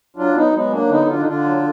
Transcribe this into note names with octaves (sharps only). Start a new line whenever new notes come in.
F#3 D4 F4
F#3 B3 D#4
F#3 G#3 B3
F#3 A#3 D4
D3 B3 D#4
D3 D4 F4
D#4
D3 D4 F4
F#3